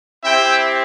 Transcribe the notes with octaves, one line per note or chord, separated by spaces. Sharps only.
C4 E4 G4 E5 G5